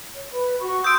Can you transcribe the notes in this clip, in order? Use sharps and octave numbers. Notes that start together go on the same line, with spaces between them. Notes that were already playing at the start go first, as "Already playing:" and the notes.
C#5
B4
F#4 C#6
C6 D#6 E6 G6 D7